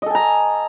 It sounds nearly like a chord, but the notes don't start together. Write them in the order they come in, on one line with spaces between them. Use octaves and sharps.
D#5 A4 G#5 A#5